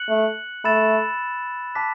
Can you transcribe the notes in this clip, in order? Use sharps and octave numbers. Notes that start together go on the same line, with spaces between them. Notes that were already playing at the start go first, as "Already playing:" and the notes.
Already playing: F#6 C#7 F#7
A3
A3 B5 E6 A6 E7
A5 D6 F#6 B6